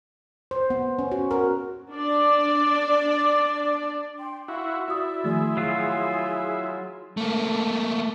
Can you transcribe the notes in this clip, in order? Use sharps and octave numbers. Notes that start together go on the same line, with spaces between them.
C5
B3
C#4
F#4
A#4
D4 D5
G5 C6
E4 F#4 F5 C6
E4 F#4 D5 D#6
D#3 F3 A3 G#4 C6
F#3 F4
A3 A#3